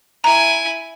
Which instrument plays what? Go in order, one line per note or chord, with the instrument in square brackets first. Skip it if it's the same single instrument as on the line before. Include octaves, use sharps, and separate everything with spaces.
[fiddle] E4 G#5 [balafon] A#5